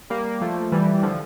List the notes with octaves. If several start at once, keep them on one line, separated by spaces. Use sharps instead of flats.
G3 A#3
F3 A3
E3 G3
D3 F3